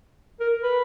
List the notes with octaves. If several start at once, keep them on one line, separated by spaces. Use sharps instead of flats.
A#4
B4